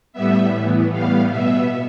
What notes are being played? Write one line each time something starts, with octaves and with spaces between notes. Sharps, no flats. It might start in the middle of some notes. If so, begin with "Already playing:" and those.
A2 G3 B3 E5
A2 E3 B3
A2 G3 B3 F5
B2 B3 E5